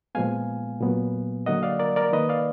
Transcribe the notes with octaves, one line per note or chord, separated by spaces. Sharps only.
A#2 F3 G#3 B3 F5 G#5
A#2 F#3 B3
D3 F#3 A#3 D#5 F#5
D5 F5
A#4 D5
A#4 D5
D#3 A#3 B4 D#5
D5 F5